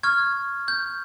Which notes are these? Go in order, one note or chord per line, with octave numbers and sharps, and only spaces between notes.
C#6 F6 G#6
G6